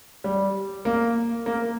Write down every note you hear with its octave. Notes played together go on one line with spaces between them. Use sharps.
G3
A#3
A#3